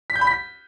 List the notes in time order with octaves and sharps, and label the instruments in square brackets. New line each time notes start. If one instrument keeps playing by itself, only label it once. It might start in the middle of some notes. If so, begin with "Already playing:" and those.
[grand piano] B6
G6
B5
B6